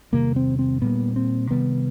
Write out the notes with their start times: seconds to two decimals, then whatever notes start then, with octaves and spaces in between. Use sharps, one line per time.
0.12 E2 C3 D#3 G3 A#3
0.36 C4
0.59 C4
0.82 A#2 G3 A#3 B3
1.16 C4
1.51 C3 D#3 G3 B3